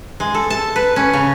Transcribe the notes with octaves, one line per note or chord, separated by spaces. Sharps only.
G#3
A4
A5
B4
C#4
C#3